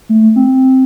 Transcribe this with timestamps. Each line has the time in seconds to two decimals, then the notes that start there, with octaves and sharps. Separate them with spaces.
0.09 A3
0.36 C4